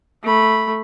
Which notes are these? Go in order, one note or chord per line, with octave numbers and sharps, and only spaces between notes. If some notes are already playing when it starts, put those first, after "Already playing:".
A3 B5